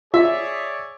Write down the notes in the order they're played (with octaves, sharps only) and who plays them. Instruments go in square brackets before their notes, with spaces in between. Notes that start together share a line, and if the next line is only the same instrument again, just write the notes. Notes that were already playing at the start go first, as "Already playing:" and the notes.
[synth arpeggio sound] F4 [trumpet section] G#4 C#5 D5 [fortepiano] E5